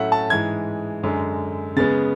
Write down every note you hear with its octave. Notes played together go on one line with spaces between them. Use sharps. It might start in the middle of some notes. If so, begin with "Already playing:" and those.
Already playing: A2 F#3 A3 C#4 E5 F#5
A5
G#2 E3 G#3 G#6
F#2 D3 G#3
C#3 G#3 B3 A6